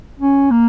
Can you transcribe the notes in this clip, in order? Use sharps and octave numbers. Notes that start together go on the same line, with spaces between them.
C#4
A#3